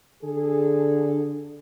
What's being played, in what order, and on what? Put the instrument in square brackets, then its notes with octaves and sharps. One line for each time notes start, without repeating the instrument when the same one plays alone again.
[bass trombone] D3 [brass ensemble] G#4 A4